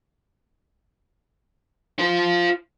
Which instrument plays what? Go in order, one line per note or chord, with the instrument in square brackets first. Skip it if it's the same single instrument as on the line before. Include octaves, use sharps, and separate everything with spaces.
[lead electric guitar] F4 C5